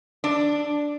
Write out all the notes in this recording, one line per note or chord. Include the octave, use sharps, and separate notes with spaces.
D4